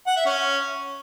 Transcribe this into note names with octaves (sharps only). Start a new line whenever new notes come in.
F#5
E5
C#4